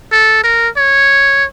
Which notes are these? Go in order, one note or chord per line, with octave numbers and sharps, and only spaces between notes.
A4
A#4
C#5